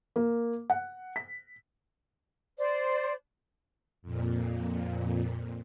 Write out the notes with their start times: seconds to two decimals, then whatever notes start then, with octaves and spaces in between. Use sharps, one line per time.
0.16 A#3
0.70 F#5
1.16 B6
2.58 C5 D5
4.02 F2 A#2